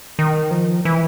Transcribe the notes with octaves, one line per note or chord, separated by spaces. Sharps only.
D#3
F3
E3